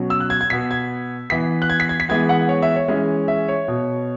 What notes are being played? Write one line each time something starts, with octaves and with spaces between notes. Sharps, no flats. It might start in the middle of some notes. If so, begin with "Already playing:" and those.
Already playing: B2 F#3 C#4
E6
F#6
G#6
G#6
B2 B3 B6
G#6
E3 B3 B6
F#6
G#6
B6
G#6
B6
E3 G#3 B3 G#6
F#5
C#5
E5
C#5
E3 G#3 C#4
E5
C#5
B2